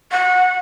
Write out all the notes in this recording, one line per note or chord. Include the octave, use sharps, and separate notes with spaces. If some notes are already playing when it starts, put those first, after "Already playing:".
F#5